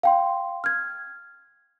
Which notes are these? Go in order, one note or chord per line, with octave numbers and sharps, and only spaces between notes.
F5 G5 C6
F6 G#6